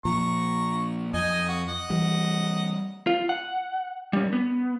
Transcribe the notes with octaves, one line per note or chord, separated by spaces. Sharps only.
A#2 F3 A#5 C#6
F2 D#4 D#5 G#5
F#4
D#5 F#5
E3 G3
F4
F#5
G3 C#4
B3